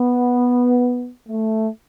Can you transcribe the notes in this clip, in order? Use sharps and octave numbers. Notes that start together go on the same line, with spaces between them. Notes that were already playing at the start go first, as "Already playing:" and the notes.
Already playing: B3
A3